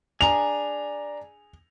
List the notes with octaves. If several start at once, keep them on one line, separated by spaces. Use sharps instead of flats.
D4 G#4 A#5 F7